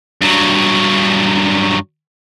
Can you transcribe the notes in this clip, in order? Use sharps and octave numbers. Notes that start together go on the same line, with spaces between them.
G2 F#3